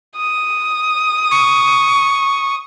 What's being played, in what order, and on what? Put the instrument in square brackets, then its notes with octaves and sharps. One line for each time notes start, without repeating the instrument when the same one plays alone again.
[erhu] D#6
[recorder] C#6